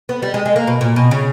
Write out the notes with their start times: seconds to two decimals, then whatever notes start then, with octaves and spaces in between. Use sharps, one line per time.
0.09 B3
0.22 G3
0.34 G#3
0.46 G#3
0.56 A#3
0.67 B2
0.81 A#2
0.96 B2
1.11 C#3